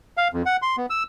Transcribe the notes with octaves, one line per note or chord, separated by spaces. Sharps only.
F5
F2
F#5
C6
B3
E6